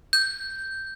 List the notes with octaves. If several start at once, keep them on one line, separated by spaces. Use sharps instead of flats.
G6